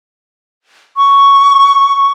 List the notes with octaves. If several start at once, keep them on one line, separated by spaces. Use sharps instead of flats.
C#6